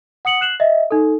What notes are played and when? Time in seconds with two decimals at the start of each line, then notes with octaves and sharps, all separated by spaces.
0.25 F#5 D#6 C#7 F#7
0.41 F#6 C7 E7 F#7
0.60 D#5 E5
0.91 D#4 A4